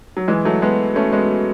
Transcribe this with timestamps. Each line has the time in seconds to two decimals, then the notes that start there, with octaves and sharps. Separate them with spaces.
0.17 F#3
0.28 E3 G#3
0.45 F#3 A3
0.62 G#3 B3
0.96 A3 C#4
1.12 G#3 B3